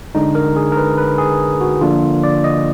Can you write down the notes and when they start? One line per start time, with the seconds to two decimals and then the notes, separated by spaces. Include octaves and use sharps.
0.15 D3 G#3 D4 D#4
0.35 A#4
0.56 G#4
0.72 A#4
0.77 B4
0.98 B4
1.18 G#4
1.61 F#4
1.81 D3 F3 A#3 D4 F4
2.23 D5
2.44 D#5